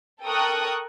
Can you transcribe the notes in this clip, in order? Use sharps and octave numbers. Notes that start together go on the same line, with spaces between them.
A4 A#4 G5 C#6 D#6 F#6